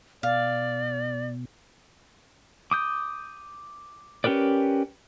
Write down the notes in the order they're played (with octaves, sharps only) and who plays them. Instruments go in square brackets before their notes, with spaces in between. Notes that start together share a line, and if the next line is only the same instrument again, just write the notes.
[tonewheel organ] B2 [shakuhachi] D5 [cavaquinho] F5
[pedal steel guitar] D6 D#6 G6
C#4 G4 A#4 B4 D5